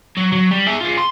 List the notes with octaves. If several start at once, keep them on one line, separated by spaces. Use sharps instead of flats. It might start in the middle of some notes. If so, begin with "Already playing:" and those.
F#3
F#3
G3
G#4 E5
F4 G#4
C6